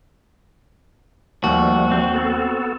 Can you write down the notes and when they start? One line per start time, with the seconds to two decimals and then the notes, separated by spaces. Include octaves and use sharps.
1.44 D#2 F3 G3 A3 F#4
1.91 C4
2.14 B3 A4